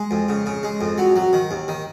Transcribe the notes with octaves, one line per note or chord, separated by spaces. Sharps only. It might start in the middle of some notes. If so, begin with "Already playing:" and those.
Already playing: G#3
F2
C#3
C#3
G#3
F2
F#3
F#3
D#3
D#2
D#3